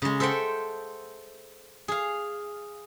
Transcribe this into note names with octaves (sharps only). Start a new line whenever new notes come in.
C#3 G#3
A4 C5 E5 F#5 G5
G#4 F5